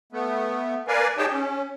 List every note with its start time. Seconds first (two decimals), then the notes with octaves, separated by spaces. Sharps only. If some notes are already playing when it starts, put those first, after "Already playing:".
0.13 A3 B3
0.88 A#4 B4 D5 F5 G#5
1.18 D#4 G4 G#4 C#5 G5 A5
1.30 C#4